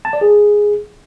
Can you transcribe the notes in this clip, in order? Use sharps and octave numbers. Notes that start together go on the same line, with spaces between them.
A5
D5
G#4